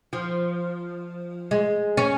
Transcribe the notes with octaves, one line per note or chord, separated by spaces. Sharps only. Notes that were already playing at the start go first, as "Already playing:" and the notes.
F3
G#3
C#4